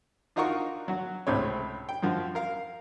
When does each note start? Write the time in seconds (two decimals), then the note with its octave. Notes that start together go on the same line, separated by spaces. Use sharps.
0.36 D4 D#4 F4 F#4 A#4 C#6
0.88 F#3 F#4
1.27 C#2 A2 C3 C4 C#5
1.89 G5
2.03 F#2 F3 F#4
2.35 A#4 F5